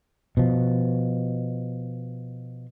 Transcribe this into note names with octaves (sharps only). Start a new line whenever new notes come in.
B2 F3